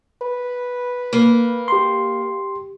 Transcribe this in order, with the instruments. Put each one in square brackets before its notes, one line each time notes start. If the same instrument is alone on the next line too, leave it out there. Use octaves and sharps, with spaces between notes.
[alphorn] B4
[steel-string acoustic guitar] A#3
[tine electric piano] G4 C6